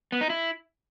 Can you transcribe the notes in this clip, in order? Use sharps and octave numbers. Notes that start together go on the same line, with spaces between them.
B3
D#4
E4